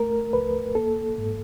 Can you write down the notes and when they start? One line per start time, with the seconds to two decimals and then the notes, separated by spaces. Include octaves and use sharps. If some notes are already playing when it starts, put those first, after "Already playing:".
Already playing: A3 A#4
0.33 C#2 B4
0.75 A#3 A4
1.18 G#2